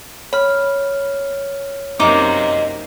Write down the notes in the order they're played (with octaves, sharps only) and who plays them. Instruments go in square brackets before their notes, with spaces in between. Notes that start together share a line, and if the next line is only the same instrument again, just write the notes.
[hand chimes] C#5 F6 [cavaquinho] B5
[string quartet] F#2 C3 A#3 [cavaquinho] D#4 D6